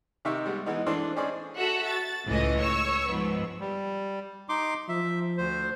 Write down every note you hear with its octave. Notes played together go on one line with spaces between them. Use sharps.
C3 D#3 D#4 G4 E5 C#6
G3 G#3 B3
E3 G#3 B3 D#4
E3 C4 D4 A4 C6
C#4 D#4 G#4 C5 D5
F#4 A4 E5 F#5
A6
C#2 A2 E3 C#4 D#5
C#5 C#6 E6
G#2 F3 B3
G3
D#4 C6 D6
F3 E5
D2 C5